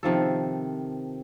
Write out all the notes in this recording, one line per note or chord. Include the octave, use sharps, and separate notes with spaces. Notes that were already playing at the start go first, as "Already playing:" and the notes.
C3 D#3 F3 A4